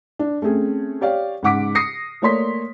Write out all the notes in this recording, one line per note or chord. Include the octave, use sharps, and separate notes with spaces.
D4
A3 C4 C#4 G#4
G4 C#5 D5 F5
G#2 C#3 F#5 D6 B6 D7
D#6 A#6 C7 C#7
A3 A#3 C#5 D5 C6 B6